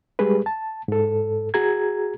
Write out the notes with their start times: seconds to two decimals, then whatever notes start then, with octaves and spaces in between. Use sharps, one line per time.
0.19 G3 G#3 G4 G#4 B4
0.46 A5
0.88 G#2 A4
1.54 F#4 G#4 A#5 G#6